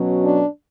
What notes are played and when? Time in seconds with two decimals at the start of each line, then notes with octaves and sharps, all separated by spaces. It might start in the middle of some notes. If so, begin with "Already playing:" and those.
Already playing: B2 F#3 C#4
0.22 D4